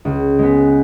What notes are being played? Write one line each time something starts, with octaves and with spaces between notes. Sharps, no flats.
C#2
G#3 B3